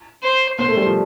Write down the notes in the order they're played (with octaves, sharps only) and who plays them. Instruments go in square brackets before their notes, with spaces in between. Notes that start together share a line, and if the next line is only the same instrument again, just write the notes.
[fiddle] C5
[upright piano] B3 [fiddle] C5
[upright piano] A3
G3
F3